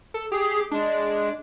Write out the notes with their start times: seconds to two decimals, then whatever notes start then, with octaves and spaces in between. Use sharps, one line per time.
0.14 A4
0.32 G4 G#4
0.71 G#3 D4